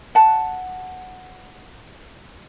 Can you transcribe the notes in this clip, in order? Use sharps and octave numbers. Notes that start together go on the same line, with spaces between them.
F#5 A5